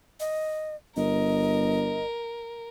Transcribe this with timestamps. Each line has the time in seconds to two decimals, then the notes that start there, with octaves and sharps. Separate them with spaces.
0.20 D#5
0.96 G1 A#4 D#5